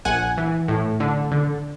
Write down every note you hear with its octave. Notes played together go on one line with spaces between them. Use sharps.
A#1 F#5 G#5
E3
A2
D3
D3